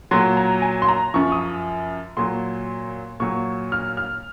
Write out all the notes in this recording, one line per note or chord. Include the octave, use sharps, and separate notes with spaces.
A#2 F#3 C6
A#5
G#5
C6
A#5
F#2 F3 C#6
D#6
A#2 F#3 C6
A#2 F#3 C#6
F6
F6